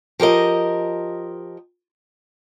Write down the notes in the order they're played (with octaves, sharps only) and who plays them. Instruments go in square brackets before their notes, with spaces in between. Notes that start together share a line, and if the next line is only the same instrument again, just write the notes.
[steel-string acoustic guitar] F3 G4 A#4 D#5